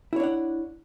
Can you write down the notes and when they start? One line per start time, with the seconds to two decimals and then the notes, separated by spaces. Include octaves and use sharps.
0.13 E4
0.16 C#5
0.20 D4
0.23 F#5